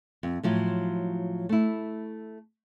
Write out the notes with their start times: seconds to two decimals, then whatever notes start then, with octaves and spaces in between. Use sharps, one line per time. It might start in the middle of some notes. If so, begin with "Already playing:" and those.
0.23 F2
0.43 A2 F3 F#3
1.49 A3 E4